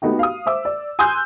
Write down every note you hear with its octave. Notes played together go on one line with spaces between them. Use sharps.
A3 B3 D#4 F#4 G4
F5 D#6
C5 E5 D6 E6
D5
G#5 C6 D#6 E6 F#6 G6